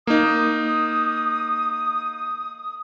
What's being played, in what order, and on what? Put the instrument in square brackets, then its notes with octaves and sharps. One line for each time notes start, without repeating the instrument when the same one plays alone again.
[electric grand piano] A#3 D#4 [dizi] D#6